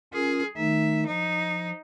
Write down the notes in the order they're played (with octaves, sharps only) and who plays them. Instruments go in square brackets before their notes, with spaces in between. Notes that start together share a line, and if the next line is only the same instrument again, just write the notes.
[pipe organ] C#4 F4 A#4 [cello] G#4
[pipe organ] D#3 A3 D#4 [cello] E5
[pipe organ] F3 [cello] D#4